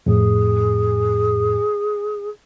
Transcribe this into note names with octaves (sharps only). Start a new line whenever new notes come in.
F2 A2 G#4